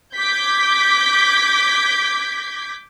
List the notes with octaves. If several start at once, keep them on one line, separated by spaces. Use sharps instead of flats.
D6 G6 G#6 B6